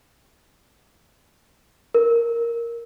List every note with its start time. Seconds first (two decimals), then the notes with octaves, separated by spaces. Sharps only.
1.94 A#4